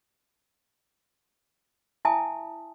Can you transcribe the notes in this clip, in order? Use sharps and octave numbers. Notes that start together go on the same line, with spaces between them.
E4 E5 G#5 A5 D#6